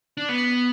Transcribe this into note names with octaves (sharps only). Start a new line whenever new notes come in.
D4
B3